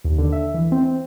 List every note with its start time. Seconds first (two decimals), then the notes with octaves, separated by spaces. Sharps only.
0.04 D#2
0.18 D3
0.32 E5
0.54 E3
0.72 C4